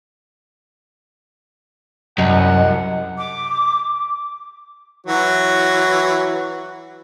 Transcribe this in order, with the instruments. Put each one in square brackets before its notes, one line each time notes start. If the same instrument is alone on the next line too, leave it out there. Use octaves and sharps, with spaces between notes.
[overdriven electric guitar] C2 [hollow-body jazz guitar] F#2 [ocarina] D#5 [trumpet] F#5
[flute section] D6
[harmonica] E3 F#3 F#4